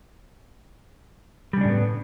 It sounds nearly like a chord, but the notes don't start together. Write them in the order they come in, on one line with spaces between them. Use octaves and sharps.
G3 C#3 D4 A2 B3